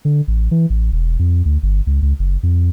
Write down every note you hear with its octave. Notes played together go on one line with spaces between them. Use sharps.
D3
A1
E3
A1
E1
F2
D2
G1
C#2
C#2
F#1
F2